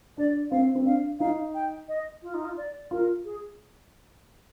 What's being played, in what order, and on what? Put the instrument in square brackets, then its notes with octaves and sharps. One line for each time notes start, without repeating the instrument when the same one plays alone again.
[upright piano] D4 [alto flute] D5
[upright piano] C4 [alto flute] F5
[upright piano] C4
[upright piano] D4 [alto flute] F5
[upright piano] D#4 [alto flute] F5
[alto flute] G5
D#5
F4
D#4
F4
D5
[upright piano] F4 [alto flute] A#4
[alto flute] G#4